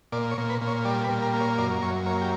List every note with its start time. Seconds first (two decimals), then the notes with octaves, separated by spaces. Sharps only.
0.12 A#2 D5
0.31 C#5
0.38 A#2
0.50 B4
0.61 A#2
0.68 C#5
0.85 G3 D5
1.04 B4
1.10 A#2
1.22 A#4
1.33 A#3
1.40 C#5
1.58 F#2 D5
1.82 F#2 C#5
2.06 A#3 C#5
2.21 G4